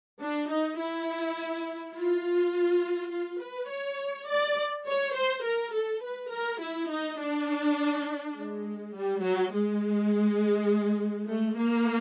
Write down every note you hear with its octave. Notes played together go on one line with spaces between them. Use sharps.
D4
D#4
E4
F4
F4
B4
C#5
D5
C#5
C5
A#4
A4
B4
A#4
E4
D#4
D4
G#3
G3
F#3
G#3
A3
A#3